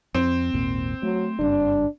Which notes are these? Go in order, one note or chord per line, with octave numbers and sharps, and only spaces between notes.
F2 C4
G#1 D#2 A#2
F#3 A3
F#1 G2 D4